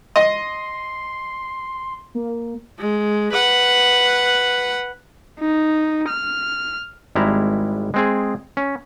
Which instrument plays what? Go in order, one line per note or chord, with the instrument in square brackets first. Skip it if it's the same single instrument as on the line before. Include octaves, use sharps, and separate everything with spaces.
[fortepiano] D#5 [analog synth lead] C6
[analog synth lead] A#3
[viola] G#3
B4 F#5
[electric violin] D#4
F6
[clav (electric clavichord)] G#1 G3 G#3 E4 A#5
G#3 C4 G#4
C#4